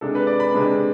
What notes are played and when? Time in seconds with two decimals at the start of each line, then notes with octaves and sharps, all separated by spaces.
0.01 C3 G#3 D4 A4
0.15 B4
0.27 D5
0.40 B5
0.53 C3 G#3 D4